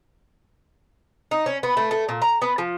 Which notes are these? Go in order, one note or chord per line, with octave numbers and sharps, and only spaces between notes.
D#4
C#4
B3
A3
A3
A#2
A#5
B3
F3